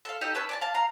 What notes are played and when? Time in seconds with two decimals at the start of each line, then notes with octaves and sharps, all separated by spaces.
0.05 A4 F5
0.21 D#4 G4 A4 D#5
0.35 C#4 B4 A5 E6
0.49 D5 G#5 A5
0.61 F5 A5
0.74 F5 A#5